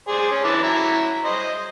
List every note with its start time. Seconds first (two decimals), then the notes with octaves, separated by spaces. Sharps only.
0.08 G#4 C5 D5
0.31 C#4
0.44 E3 A5 D6
0.63 F#3 E4 A#5
1.25 C5 D#5